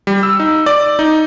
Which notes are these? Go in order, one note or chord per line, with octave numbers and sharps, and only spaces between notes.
G3
E6
D#4
D5
D#4